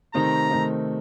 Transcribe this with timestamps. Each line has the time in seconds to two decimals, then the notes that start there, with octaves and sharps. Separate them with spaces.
0.14 C3 D#3 A3 C4 D#4 A#5
0.51 C3 D#3 A3 C4 D#4